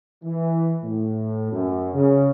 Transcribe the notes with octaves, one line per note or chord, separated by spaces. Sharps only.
E3
A2
F#2
C#3